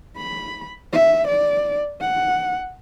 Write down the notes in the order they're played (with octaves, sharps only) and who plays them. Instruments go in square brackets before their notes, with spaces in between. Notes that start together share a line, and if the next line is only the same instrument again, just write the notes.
[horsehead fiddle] B5
E5
D5
F#5